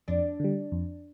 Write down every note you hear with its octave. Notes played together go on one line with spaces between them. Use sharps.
F2 D4
D3 G3
F2